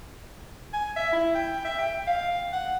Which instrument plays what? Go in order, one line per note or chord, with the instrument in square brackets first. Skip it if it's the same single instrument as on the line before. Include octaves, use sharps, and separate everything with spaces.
[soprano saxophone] G#5
E5
E4
G5
E5
G5
F5
F#5